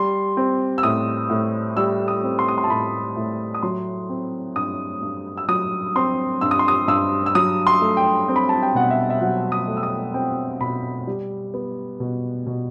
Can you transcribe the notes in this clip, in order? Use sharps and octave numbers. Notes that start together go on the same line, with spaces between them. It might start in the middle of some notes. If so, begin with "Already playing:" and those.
Already playing: G3 C6
C4
E6
A2 D#6
A2
G3 E6
D#6
C4
C6
D#6
C6
A5
A2 B5
A2
D#6
F#3 C6
C4
G2 D#6
G2
E6
F#3 D#6
C4 C6
G2 E6
D#6
C6
D#6
G2 E6
E6
F#3 D#6
C6
A3
G5
C4
B5
A5
G5
B2 F#5
E5
E5
F#3 F#5
D#6
A3
E6
D#6
C4 G5
B2 B5
G3
B3
B2
B2